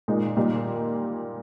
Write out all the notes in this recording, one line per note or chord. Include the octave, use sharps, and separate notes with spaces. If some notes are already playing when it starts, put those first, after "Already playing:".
A#2 G#3 D#4
A#2 G3 A#3 D#4